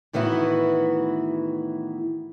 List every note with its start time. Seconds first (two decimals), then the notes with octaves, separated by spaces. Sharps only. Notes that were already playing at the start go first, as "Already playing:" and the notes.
0.13 A2 D#3 E3 B3 E4 F#4